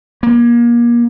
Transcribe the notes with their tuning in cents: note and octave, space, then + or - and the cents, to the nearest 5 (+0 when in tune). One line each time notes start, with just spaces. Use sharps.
A#3 +30